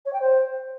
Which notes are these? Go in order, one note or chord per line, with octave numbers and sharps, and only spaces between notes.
C#5
G5
C5